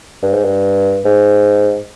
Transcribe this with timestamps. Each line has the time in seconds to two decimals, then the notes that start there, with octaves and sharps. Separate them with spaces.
0.23 G2
0.34 G#2
0.44 G2
1.05 G#2